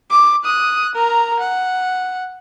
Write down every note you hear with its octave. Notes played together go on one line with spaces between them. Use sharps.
D6
D#6 F#6
A#4 A#5
F#5